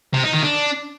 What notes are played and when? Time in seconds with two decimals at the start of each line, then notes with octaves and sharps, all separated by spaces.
0.14 C3
0.23 D#4
0.33 D#3
0.43 D4